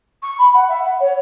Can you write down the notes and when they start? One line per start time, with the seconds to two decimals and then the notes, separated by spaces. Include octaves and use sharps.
0.23 C#6
0.38 B5
0.54 F#5
0.69 E5
0.84 F#5
1.00 C#5